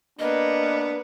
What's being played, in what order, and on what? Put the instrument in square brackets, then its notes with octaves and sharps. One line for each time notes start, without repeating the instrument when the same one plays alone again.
[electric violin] A#3 B4 [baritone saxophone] B3 [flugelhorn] D4 [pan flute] D#5